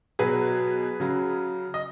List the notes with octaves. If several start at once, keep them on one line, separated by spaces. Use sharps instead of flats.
B2 F#3 G#4 B4
C#3 F#3
D#5